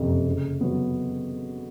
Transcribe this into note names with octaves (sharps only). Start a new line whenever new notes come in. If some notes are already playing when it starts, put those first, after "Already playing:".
Already playing: F#1 F2 C3
C#3
F#3 B3